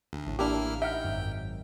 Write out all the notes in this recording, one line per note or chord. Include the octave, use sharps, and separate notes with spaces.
D2
A1 A2
A#3 D4 E4 G4 F6
D#4 E5 F#5 G5 F6
G#1 F#2